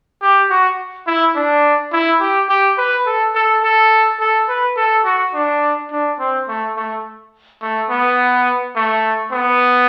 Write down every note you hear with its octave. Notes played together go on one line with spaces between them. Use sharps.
G4
F#4
E4
D4
E4
G4
G4
B4
A4
A4
A4
A4
B4
A4
F#4
D4
D4
C4
A3
A3
A3
B3
A3
B3